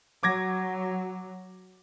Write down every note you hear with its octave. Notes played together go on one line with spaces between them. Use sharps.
F#3 D6 G#6 A#6